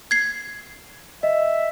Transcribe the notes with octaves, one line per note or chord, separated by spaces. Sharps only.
G#6 C7
D#5 E5